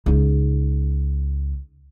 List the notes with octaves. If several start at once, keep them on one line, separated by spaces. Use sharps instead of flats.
C#2 D#4